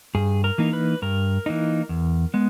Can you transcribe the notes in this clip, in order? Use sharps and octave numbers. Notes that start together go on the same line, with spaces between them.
G2 G#4
A#4
E3 A#3 D#4
B4
G2 A#4
E3 A#3 D#4
E2
G#3 B3